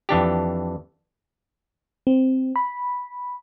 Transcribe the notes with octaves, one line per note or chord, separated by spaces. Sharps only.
F2 E3 D4 G4
C4
B5